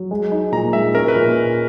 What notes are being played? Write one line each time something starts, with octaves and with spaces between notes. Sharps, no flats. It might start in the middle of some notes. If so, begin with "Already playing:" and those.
Already playing: F#3
G#3
D#4
A#2 A#5
G#3 E5
C#4 A#4
B4
A#2